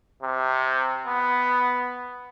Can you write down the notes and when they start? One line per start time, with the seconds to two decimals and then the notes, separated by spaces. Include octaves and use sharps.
0.22 C3
1.07 B3